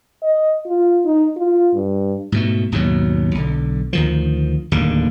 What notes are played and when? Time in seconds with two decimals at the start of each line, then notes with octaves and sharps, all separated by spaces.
0.22 D#5
0.66 F4
1.05 D#4
1.37 F4
1.74 G2
2.32 G#2 B2 A3
2.72 G#1 D#2 B2 F#3
3.35 B1 D3
3.93 D2 D#3 F3
4.72 D1 D#2 D3 A#3